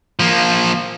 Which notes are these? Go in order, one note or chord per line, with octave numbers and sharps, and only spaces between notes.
F3 A#3